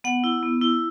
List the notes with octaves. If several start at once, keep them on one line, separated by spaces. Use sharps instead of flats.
B3 F#5
E4
B3
E4